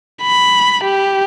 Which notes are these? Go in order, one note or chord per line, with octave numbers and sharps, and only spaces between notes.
B5
G4